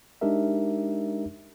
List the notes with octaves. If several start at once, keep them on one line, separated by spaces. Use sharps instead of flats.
G#3 D4 D#4 G4 A#4 E5